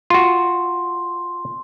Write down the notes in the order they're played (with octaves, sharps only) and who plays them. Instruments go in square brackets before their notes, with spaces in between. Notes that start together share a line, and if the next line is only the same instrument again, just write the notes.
[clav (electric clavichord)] F4 F#4 [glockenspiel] C6